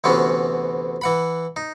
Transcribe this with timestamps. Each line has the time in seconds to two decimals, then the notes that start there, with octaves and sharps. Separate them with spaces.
0.04 D2 C3 E3 B3 C#4
1.01 E3 F#5 B5
1.56 D#4